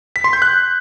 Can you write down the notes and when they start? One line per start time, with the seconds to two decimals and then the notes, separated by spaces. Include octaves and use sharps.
0.16 B6
0.24 C6
0.33 G6
0.42 F#6